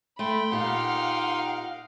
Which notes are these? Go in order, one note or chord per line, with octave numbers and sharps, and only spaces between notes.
A3 G5 B5 C6
A#2 D#4 G4 F5 F#5